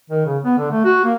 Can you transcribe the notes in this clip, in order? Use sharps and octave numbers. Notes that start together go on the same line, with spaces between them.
D#3
C#3
B3
D3
A3
F#4
A#3